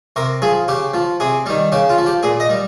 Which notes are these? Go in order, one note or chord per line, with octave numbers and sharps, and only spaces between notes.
C3 A#4
F3 G#4
C#3 G4
F3
C3 G#4
D#3 G3
C#3 G4
F4
F3
G4
A#2 G#4
D#5
G3